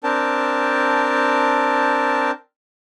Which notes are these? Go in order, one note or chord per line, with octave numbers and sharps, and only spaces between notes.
C4 D4 A#4 G5 A5